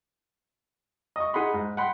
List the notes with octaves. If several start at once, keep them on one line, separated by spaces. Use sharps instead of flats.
D#5 C#6
D#4 G#4 F#5 B5 C6
G#2
F#5 G5 B5 C6